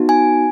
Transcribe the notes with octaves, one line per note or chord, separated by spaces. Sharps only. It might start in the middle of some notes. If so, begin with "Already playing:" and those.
Already playing: B3 D#4 F#4
G#5